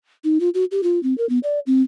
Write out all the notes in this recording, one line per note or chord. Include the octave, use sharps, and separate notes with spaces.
D#4
F4
F#4
G4
F4
C4
A#4
B3
D5
C4